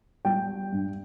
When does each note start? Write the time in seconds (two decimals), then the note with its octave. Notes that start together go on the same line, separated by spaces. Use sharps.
0.25 G3 G5
0.72 G2